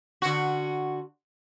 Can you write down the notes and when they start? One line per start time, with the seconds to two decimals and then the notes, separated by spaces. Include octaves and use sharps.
0.22 D3 F#4